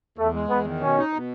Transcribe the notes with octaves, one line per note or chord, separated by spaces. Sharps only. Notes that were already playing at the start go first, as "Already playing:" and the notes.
E2 A3
G#3
E2 B3
D#3
B2 C#4
D#4
B2